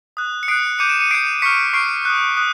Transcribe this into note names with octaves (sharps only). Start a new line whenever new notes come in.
D#6 F#6
C#7
D#6 F#6 C7 D7
D6 G6 C#7 D#7
D7 E7
C#7 D#7
D6 G6 C7 D7
C#6 F6 B6 C#7
C#6 F6 C7 D7
D#6 F#6
D#6 F#6